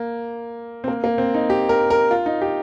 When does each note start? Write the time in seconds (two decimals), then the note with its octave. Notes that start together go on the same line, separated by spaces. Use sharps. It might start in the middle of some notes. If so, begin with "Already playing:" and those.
Already playing: A#3
0.84 C4
0.88 A#3
1.04 A#3
1.18 C4
1.34 D#4
1.50 G4
1.69 A#4
1.90 A#4
2.11 F4
2.26 D#4
2.41 G4